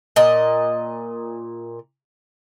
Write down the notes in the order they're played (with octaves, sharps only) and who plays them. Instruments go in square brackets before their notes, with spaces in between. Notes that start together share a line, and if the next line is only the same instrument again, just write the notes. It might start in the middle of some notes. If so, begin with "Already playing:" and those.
[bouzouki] A#2 D#5